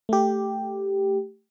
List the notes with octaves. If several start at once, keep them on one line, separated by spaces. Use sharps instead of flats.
A3 G4